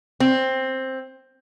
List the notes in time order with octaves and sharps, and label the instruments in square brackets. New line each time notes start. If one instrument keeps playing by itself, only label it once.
[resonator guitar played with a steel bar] C4